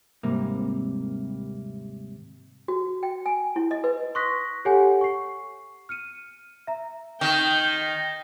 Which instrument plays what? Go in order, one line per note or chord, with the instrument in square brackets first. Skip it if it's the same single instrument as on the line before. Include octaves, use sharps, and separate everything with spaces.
[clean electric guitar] D#2 G#2 C3 G3 A#3 C4
[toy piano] F#4
G5
G#5
E4
D#5
B4
[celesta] C6 C#6 D#6 F#6 A#6 B6
G4 A4 C#5 F#5 G#5
C#6 C7
F6 C#7 D#7
E5 A#5
[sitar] D#3 [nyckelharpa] G5